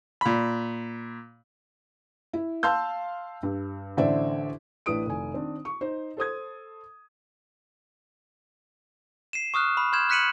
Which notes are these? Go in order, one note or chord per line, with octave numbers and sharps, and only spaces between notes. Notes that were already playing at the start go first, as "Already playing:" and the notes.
A#2 B5
E4
F5 A5 C6 E6 G6
G2
A1 D3 C5 D5 E5
A1 D4 E4 B4 D#6 D7
F1 D#3 G#5
D#3 C4 D4
C#6
D#4 C5
A4 C5 D#6 G#6
C7 D#7 E7
C#6 D#6 F6 F#6
B5
C6 F6 G6 G#6 E7
F6 F#6 B6 C#7 D#7 F#7